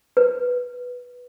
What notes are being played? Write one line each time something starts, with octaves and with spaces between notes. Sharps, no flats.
B4